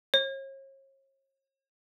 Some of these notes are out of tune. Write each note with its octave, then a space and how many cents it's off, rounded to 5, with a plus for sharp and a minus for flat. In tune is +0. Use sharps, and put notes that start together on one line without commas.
C#5 -40